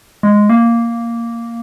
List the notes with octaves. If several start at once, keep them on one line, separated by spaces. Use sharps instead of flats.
G#3
A#3